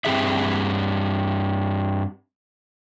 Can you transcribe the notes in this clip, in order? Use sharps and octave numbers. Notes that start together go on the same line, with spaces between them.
G2 C4 G4 G#4 E5